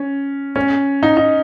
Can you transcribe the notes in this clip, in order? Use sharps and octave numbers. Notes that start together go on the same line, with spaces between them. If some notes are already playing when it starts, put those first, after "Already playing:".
Already playing: C#4
C#4
D#4
D#4